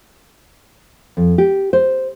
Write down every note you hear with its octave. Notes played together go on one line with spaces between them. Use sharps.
F2
G4
C5